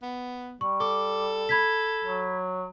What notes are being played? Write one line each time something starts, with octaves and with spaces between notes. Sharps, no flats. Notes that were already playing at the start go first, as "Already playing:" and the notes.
B3
G3 C#6
A4 D6
B5 G#6 B6
F#3